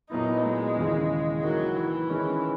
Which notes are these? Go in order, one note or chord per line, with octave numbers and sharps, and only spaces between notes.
A#2 F#3 B3 D#4 E4
G#3
D#2 C#3 E3
D#3 F#3 A#3 E4
E3
D#3 G#3 C#4 E4